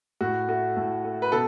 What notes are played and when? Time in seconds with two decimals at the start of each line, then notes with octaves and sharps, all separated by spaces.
0.21 A2 F#4
0.48 A3 F#4
0.77 A2
1.04 A3
1.22 B4
1.32 B2 A4